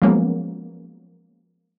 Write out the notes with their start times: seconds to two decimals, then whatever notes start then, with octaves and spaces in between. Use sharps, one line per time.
0.02 F3 F#3 G#3 A#3 B3 C#4